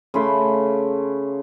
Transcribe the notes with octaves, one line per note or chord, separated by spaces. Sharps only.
C#3 A3 B5 C6